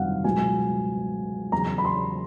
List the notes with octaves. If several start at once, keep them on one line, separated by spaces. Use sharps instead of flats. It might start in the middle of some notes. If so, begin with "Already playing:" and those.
Already playing: G1 F2 C3 D#3 F#3 F5 F#5
C#2 B2 F#3 G#5
E2 C#3 F#3 A#5
B5
C6